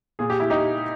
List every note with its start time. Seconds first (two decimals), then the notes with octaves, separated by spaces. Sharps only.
0.19 A#2 G#4
0.30 G4
0.40 E4
0.50 D#4 G4